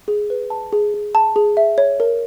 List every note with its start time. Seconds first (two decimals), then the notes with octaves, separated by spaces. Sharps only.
0.08 G#4
0.30 B4
0.50 A5
0.73 G#4
0.94 G#4
1.15 A5
1.36 G#4
1.57 E5
1.78 C#5
2.00 A#4